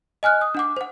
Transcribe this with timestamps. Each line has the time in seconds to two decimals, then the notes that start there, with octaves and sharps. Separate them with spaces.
0.23 D#5 G#5 F6 F#6
0.41 D#6
0.55 D4 F#5 D6
0.77 C5 F#5